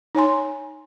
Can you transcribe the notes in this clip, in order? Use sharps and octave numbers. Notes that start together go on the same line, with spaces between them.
D#4 C#5 G#5 C6